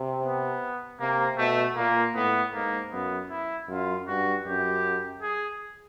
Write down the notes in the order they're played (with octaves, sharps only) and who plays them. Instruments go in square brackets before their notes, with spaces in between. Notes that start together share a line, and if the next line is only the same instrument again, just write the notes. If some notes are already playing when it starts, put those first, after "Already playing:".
Already playing: [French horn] C3
[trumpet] B3
[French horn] C3 [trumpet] A#3
[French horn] B2 [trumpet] A3
[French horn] A#2 [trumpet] A#3
[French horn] A2 [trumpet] B3
[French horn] G#2 [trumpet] A#3
[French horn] F#2 [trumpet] B3
[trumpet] E4
[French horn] F#2 [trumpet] F4
[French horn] G2 [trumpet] F#4
[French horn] F#2 [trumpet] G4
[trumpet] G#4